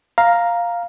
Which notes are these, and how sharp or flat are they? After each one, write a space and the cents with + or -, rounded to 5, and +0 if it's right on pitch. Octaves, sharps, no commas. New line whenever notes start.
F5 +0 A#5 +5